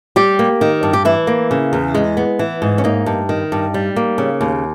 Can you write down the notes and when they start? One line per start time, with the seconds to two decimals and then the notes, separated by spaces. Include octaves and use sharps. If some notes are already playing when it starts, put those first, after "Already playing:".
0.16 G3 G4
0.39 A#3
0.61 D#3
0.83 G2
0.93 G4
1.05 E3 E4
1.27 A#3
1.51 C#3
1.73 E2
1.95 G#3
2.17 B3
2.39 E3
2.62 G#2
2.78 C#4
2.84 A#3 D#4
3.06 G2
3.29 D#3
3.52 G2
3.74 G3
3.96 A#3
4.18 C#3
4.41 D#2